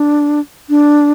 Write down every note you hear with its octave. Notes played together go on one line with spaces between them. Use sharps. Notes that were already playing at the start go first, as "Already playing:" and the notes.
Already playing: D4
D4